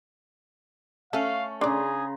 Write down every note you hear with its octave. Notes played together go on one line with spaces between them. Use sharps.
A3 C#4 A4 F5
C#3 D4 G#4 D5 A#5 C6